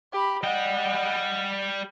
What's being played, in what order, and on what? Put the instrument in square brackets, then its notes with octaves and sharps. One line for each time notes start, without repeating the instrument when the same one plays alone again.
[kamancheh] G4 B5
[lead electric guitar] G3 G5 [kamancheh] D#5 F#5